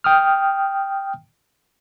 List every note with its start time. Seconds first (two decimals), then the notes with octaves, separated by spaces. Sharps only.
0.04 G5 D#6 F6